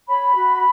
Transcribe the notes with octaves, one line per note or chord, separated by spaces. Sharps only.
C#5 B5
F#4